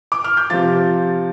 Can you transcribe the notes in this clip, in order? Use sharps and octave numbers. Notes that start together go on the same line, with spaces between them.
D6
F6
G6
C3 F3 A6